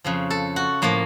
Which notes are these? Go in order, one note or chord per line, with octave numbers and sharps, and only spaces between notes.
F2 C#3 F3
A4
F#4
A2 F3 A#3